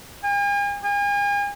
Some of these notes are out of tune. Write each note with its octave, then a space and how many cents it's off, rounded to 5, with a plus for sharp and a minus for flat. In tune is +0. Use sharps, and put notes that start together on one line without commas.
G#5 -45
G#5 -40